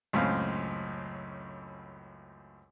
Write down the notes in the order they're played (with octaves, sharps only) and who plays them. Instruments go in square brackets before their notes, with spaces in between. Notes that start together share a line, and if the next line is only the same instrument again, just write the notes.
[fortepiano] C#2 F#2 A2 C4 F5 F6